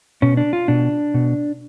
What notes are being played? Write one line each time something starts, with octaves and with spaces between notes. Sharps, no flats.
B2 C#4
D4
F4
B2 D4
B2